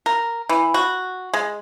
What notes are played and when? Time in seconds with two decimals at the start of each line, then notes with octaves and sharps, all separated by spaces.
0.06 A#4
0.49 E3
0.74 F#4
1.34 G#3